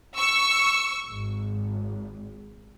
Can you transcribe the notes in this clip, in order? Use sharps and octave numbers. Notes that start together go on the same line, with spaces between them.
C#6 E6
G#1